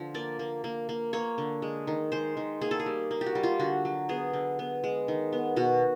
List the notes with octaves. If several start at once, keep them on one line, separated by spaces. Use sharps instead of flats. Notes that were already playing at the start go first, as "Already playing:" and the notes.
Already playing: D3 F3
A#3 D5
A#3
A#3
A#3
A#3 C#5
D3
G#3
D#3
G#3 C5
D#3
A#3 G#4
A4
G#4
G3
A#3
G4
F#4
G3
F4
D3 F#4
F#3
B3 G#4
D3
B3
G#3
D#3
B3
B2 F#4